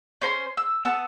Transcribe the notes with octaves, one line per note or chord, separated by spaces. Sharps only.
C#4 C5 A#5 C6
E6
B3 F#5 A5 E6